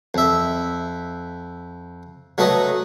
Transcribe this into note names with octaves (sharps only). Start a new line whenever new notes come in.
F2 E5
F#3 A3 B4 D#5